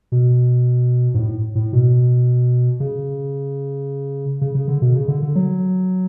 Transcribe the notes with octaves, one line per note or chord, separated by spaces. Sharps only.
B2
G#2
A2
A2
B2
C#3
C#3
C#3
D3
B2
C#3
D3
D3
F#3